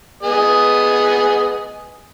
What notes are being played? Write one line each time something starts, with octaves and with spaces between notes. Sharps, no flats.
B3 G#4 D#5